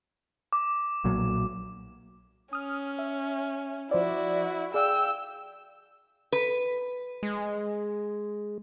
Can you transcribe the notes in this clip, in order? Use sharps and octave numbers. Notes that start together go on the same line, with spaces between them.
D6
B1 A#2 F#3
C#4 D#6 F6
E5
F3 E4 F#4 C5 D5
G#4 D5 F5 G5 E6
B4
G#3